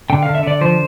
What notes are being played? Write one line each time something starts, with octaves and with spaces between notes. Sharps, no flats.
D3 G5
D3 F5
E5
D3 D5
F3 C5